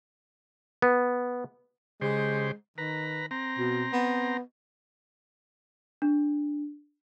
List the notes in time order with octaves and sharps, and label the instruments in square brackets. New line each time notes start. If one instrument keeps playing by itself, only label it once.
[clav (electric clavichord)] B3
[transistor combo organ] C#3 G4 C5 [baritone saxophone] G#3
[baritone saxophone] D#3 [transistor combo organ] B4 A#5
[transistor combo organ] C4 A#5
[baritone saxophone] B2
B3
[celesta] D4